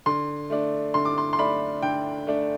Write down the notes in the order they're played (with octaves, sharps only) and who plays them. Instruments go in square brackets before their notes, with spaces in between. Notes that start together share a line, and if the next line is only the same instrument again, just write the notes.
[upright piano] D3 C6
A3 D4
D3 C6
D6
C6
C6
A3 D4 B5
D3 G5
A3 D4